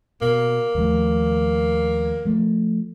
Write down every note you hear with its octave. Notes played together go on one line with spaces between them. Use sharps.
B2 A#3
D#2 F3 A3
F3 A3